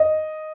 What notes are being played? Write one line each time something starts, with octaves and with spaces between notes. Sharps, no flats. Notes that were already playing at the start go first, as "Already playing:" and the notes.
Already playing: D#5